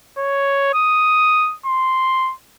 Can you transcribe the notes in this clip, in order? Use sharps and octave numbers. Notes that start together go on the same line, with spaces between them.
C#5
D#6
C6